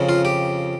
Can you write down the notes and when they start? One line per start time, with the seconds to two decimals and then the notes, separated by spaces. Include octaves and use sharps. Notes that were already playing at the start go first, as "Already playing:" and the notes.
Already playing: F2 C#3 F3
0.09 F4
0.25 G4